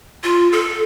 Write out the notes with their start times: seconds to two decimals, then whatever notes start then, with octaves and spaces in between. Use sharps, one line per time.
0.23 F4
0.52 A4